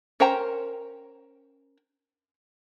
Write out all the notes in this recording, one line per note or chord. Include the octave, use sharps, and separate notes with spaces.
C#4 A#4 C5 G5 A#5